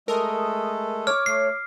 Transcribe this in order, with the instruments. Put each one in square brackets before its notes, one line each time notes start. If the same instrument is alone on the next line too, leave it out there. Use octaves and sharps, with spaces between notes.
[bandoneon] G#3 A3 A4 [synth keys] A#4 D#6
[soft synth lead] C#5 [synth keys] D6 [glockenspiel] F6
[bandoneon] A3 [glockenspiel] C7